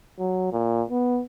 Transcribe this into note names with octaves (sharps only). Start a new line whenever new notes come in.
F#3
A#2
B3